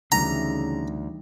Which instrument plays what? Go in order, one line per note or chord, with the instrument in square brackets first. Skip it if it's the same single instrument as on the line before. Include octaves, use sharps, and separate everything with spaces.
[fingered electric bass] D2 [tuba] C#3 [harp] E3 G3 D#4 [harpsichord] A#5